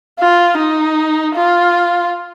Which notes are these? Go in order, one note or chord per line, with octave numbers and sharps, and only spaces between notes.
F4
D#4
F4